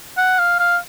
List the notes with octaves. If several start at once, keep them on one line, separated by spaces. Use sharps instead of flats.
F#5
F5
F5